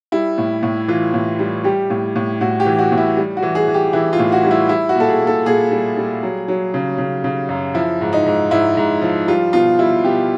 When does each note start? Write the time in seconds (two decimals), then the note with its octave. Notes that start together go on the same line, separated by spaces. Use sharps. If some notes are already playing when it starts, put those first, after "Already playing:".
0.12 G3 E4
0.38 A2
0.63 A2
0.88 E3 F4
1.14 A2
1.39 G3
1.64 G3 G4
1.90 A2
2.16 A2
2.41 A2 F#4
2.60 G4
2.66 E3
2.79 F#4
2.92 A2
2.98 E4
3.17 G3
3.37 F#4
3.42 E3
3.55 G#4
3.68 E3
3.74 G4
3.93 E3 E4
4.13 F4
4.19 A2
4.32 F#4
4.45 G3
4.51 E4
4.69 G3 E4
4.89 F#4
4.95 A#2 A4
5.09 G#4
5.21 A#2
5.27 A4
5.46 A#2 G#4
5.71 G3
5.97 G3
6.23 F#3
6.48 F#3
6.74 C#3
6.98 C#3
7.24 C#3
7.49 F#2
7.74 F3 E4
8.01 G#2
8.13 D#4
8.26 G#2
8.51 G#2 E4
8.77 G#2
9.02 F3
9.28 G3 F4
9.53 B2 F4
9.79 G3 E4
10.04 B2 G4